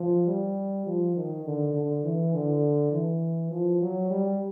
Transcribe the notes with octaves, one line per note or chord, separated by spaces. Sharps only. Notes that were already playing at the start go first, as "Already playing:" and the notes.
Already playing: F3
G3
F3
D#3
D3
D3
E3
D3
E3
F3
F#3
G3